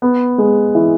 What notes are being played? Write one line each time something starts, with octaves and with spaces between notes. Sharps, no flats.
B3
G#3
E3